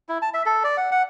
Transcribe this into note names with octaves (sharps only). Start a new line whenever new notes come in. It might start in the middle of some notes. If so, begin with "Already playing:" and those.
E4
A5
E5
A4
D5
F#5
F#5